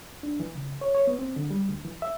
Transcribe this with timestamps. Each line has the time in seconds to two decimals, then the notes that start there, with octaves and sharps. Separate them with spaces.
0.23 D4
0.40 E3
0.55 C#3
0.81 C#5
0.95 C#5
1.07 B3
1.19 C4
1.36 D3
1.51 G3
1.69 D2
1.85 E3
2.02 E5